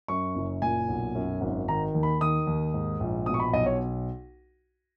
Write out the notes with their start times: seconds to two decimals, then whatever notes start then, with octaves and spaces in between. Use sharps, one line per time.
0.08 F#2 C#6
0.35 F#1
0.62 A#2 G#5
0.88 B1
1.15 F#2
1.41 G#1
1.68 D#3 A#5
1.95 D#2
2.03 B5
2.21 D#3 D#6
2.47 D#2
2.74 G#2
3.00 A#1
3.26 B2 D#6
3.34 C#6
3.40 B5
3.53 B1 D#5
3.66 C#5